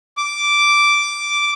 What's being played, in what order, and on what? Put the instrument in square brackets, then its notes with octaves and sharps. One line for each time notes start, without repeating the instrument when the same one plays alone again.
[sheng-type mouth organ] D6